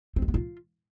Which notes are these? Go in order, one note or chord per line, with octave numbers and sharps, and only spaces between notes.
C4
G#3
B3
F4